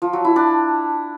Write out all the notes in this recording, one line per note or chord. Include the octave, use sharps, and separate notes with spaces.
F3
F#3
E4
D4